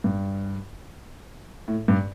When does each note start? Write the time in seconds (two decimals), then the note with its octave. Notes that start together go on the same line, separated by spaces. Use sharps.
0.04 G2
1.68 A2
1.88 G2